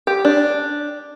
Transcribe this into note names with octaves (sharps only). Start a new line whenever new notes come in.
G4
D4